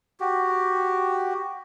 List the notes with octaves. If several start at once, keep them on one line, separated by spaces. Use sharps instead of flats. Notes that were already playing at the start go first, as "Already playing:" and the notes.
F#4 G4